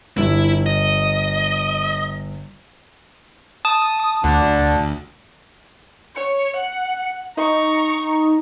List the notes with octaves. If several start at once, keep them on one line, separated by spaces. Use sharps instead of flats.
G1 E4
D#5
A5 D#6
D2 D3 D4
C#5 C#7
F#5
D#4 A#5 C#6